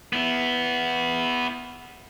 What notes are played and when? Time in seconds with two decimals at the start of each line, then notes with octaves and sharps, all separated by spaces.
0.13 B3 E4